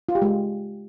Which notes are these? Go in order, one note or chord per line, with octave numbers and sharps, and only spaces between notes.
F4
G4
G#3